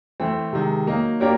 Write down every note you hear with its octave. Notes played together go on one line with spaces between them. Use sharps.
E3 A3 C4
C3 D#3 G#3
F#3 A#3 D#4
A#3 D4 G4 A#4 C#5